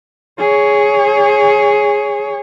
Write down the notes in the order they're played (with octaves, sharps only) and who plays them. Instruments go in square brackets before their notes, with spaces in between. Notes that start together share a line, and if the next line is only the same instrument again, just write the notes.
[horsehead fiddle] G#4 C#5